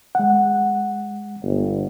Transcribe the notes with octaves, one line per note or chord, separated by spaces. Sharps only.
G#3 F#5
G1